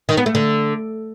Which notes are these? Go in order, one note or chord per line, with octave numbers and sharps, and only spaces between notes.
D#3
B3
A3
D3